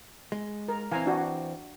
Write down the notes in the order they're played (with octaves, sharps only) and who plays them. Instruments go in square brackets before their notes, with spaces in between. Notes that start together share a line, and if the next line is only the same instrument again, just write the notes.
[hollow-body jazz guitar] G#3
[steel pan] A#4
[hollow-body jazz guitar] E3 C4 [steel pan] F5 G#5 A#5
[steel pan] D4 F#4